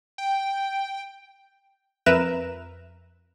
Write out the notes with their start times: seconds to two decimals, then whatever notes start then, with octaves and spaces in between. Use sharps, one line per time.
0.18 G5
2.06 F2 A#4 B4 E5 A#5 E7